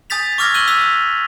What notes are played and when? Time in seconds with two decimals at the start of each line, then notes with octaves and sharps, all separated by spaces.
0.10 G#5 D#6 G6 A6 B6 F7
0.38 C#6 D6 E6 F6 G#6 A#6
0.54 E6 F#6 D#7 F#7 G7
0.68 D#6 E6 B6 F7